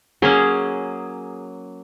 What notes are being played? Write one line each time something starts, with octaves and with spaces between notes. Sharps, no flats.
F#3 A#3 C#4 G#4